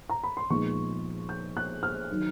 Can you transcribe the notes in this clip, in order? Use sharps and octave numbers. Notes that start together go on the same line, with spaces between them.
A#5
B5
C6
A#2 F3 G#3 B3 D#4 C#6
G6
F#6
F6
D#3 F#3